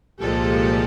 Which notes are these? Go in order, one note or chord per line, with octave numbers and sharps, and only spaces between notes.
C2 A#2 F3 G#3 G4 A4